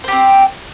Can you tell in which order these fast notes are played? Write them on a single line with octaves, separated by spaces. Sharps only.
C5 G4 C4